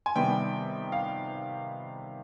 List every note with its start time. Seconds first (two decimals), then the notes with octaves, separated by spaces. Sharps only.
0.06 G#5
0.15 C3 D#3 G3 B3 G5
0.92 F5